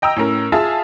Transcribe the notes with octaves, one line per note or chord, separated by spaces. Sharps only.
D#5 G5 A#5 E6
A2 C#4 A#4
F4 G#4 E5 A5